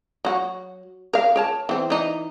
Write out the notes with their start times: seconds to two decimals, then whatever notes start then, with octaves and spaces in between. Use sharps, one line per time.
0.25 F#3 F#4
1.13 A#4 F5
1.36 A#4 C#5 A5
1.69 E3 C4
1.90 E3 D#4